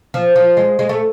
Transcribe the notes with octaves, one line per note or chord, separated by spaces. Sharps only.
F3
F3
G#3
G#3
A3